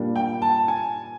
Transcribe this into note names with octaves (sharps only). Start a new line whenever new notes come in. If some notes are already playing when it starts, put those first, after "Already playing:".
Already playing: A#2 G3 A#3 D4
G5
A5
G#5